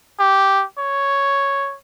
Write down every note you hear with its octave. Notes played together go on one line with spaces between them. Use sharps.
G4
C#5